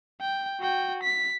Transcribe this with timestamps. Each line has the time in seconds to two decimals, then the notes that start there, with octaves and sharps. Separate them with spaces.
0.21 G5
0.60 F#4 G5
1.03 B6